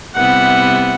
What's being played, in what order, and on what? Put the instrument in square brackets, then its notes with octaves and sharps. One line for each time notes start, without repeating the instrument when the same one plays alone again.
[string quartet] C3 G3 B3 E4 [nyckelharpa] F#5